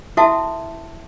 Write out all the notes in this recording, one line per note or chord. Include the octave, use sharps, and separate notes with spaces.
E4 F#4 A4 E5 G5 A5